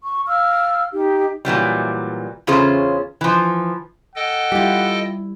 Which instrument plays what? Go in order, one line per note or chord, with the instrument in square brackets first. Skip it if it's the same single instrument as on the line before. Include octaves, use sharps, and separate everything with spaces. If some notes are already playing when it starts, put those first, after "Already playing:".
[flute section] C#6
F5 E6 F6
D#4 G4
[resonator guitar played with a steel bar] A#2 E3 F#3 G3
E2 C#3 C#4 F4 G#4 C5
E3 F3
[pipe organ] A4 D#5 G5 [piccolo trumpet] F#5
[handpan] G3 E4 [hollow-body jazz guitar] F4 G4